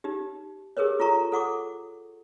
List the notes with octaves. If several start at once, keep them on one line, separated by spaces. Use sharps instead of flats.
D#4 G4
G4 G#4 A#4 B4 C#5
F4 A4 A#5 C#6
A4 F#5 C#6 D6